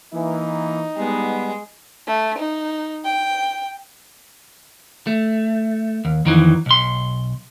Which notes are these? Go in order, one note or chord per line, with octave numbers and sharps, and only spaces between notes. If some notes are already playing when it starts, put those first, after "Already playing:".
E3 A#3 D#4
G3 G#3 B3
A3
D#4
G5
A3
D#2
F2 D#3 E3
B1 C6